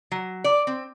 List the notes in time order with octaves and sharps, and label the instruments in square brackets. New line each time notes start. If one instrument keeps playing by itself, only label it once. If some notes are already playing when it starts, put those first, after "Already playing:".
[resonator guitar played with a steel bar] F#3
D5
C4